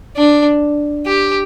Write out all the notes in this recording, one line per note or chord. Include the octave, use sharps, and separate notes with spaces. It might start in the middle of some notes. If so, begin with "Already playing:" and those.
D4
G4